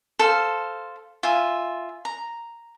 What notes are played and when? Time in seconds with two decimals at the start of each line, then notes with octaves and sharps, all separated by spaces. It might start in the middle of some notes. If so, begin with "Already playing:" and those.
0.19 A4 C5 F5
1.23 F4 E5 G#5
2.05 A#5